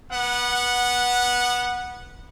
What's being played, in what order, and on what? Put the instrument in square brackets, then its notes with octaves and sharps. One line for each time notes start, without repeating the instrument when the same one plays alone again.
[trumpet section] B3 F#5